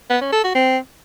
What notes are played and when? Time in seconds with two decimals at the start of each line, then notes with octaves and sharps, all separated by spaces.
0.10 B3
0.21 C#4
0.32 A4
0.44 F#4
0.55 C4